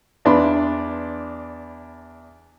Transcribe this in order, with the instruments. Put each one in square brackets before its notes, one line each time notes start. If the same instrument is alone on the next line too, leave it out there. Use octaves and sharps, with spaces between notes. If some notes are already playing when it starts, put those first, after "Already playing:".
[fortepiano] E2 D4 B5 C6